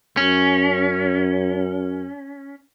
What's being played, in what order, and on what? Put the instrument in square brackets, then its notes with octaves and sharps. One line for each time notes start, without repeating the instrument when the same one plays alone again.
[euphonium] F#2 [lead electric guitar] C#4